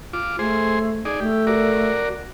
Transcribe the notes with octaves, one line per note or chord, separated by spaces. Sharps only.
F4 D6
A3 G#4 C5
D#4 G#4 D5
A3 G4
F#4 A#4 D5